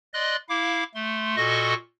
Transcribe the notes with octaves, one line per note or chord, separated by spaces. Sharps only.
D5 D#5 C6 F#6
E4 F5 D6
A3 C6
A#2 F#4 A4 D#5 C#6 A#6